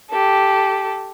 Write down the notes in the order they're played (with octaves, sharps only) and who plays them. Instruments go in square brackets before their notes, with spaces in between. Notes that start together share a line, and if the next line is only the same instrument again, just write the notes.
[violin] G4 A4